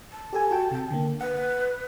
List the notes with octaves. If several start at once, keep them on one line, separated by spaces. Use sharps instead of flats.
A5
G4 A4 G#5
F#4 G5
C3 G5
D3 A#3
B4 F#5